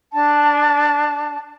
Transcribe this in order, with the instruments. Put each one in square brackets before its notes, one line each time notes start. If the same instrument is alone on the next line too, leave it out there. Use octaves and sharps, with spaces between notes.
[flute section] D4 A5